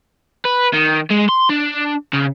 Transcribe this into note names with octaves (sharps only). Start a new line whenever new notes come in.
B4
D#3
G#3
C6
D4
C#3